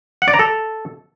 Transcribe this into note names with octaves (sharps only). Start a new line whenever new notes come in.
F#5
D5
A#5
A4